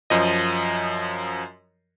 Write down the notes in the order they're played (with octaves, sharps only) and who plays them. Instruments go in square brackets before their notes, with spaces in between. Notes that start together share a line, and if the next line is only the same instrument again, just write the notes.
[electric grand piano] F#2 F3 D#5